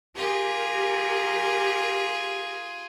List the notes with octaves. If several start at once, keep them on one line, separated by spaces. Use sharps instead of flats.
F4 G4 G#4 A#4